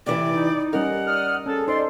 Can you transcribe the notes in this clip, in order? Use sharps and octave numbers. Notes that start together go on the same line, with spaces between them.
C3 E3 D5
D#4
G3 C#4 A#4 D#5 F#5
D5 D#6 F6
C#4 G#4 A4
D#4 A4 C5 D5 C6